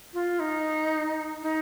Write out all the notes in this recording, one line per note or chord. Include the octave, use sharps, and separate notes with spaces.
F4
D#4
D#4